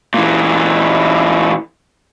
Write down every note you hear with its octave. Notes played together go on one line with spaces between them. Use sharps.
A#2 E3